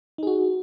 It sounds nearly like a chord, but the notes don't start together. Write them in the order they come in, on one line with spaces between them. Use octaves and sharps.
D#4 G#4 F#4